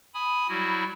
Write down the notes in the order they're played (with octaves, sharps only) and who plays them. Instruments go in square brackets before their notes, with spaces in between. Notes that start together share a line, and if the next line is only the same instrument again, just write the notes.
[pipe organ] G#5 B5 D#6
F#3 G3 E4 F#4